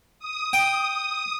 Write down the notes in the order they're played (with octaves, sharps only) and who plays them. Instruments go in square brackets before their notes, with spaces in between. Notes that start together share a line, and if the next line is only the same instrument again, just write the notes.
[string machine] D#6
[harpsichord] G5